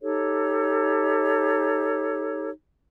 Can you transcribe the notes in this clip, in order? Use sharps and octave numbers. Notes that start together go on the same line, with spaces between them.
D#4 G4 A4 C#5